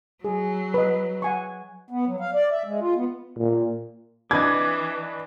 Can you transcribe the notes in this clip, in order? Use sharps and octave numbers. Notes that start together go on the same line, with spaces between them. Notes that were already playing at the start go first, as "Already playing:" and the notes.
F#3 G#4
B4 D#5
F#5 G#5 C#6
B3
F#3
F5
D5
E5
G#3
F4
B3
A#2
E3 D4 B4 D#5 D6 G#6